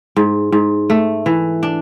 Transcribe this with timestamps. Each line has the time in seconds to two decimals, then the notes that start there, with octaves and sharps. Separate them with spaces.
0.16 G#2
0.52 G#2
0.90 A3
1.26 E3
1.63 D4